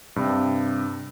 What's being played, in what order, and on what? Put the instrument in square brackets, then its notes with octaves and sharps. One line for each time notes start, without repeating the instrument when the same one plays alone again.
[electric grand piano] G2 C3